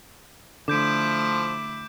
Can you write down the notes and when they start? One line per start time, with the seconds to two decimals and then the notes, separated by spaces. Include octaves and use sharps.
0.68 D3 F3 A3 E4 D6 G6 D7